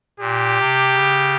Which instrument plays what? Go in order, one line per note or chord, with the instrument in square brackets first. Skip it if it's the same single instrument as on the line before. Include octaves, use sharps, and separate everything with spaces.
[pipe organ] A#2 [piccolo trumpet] G4
[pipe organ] C3
C#3